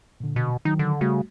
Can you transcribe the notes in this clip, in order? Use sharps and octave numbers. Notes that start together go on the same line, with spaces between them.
A#2 D3
B2
D#3 F#3 D#4
D3
C#3 G3 A3 F#4